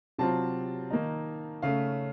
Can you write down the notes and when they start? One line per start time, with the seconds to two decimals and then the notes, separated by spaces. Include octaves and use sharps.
0.18 C3 F#3 C4 F4 A5
0.91 D#3 A#3 D#4
1.62 C#3 A3 C#4 F5